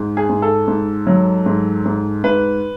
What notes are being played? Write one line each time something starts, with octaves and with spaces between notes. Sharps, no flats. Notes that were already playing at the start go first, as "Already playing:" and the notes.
Already playing: G#2
G#4
G#2
A4
G#2
F#3
G#2
G#2
G#2 B4